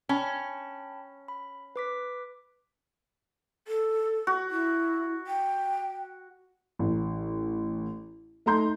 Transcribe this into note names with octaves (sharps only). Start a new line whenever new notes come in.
C#4 G5 A5 B5
B5
B4 D6 B6
A4
F#4
E4
G5
A1
A3 D#4 A#5 C6 G6